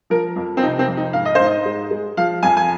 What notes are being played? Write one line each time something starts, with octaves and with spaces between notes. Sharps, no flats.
F3 A#4
F2
C4
C3 D#4
C4
F2
D#4
G#2 F5
D#5
G#2 C5
D#5
G#3
G#3
F3 F5
F2 G#5
G#5